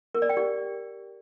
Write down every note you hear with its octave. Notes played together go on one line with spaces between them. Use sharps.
A#4
D5
G5
G4